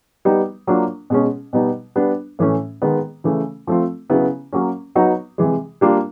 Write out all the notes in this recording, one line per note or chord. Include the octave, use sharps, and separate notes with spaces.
G3 B3 D#4
F#3 A#3 D4 F4
B2 G#3 C#4
B2 G3 B3 D#4
G3 B3 D4
A2 E3 A3 C#4
D#3 G#3 B3
C#3 E3 A3
F3 A3 C4 F4
C#3 F#3 B3 E4
F#3 A#3 C#4
F#3 B3 D#4 F#4
C3 E3 G#3
G3 A#3 D4 F4